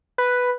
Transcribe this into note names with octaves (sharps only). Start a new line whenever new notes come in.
B4